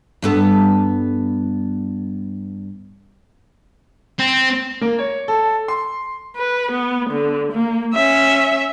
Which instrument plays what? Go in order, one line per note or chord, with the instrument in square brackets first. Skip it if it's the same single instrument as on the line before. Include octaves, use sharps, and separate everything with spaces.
[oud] G2 B3 A4
[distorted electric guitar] C4
[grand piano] A#3
C#5
A4
C6
[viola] B4
B3
D3
A#3
C#4 E5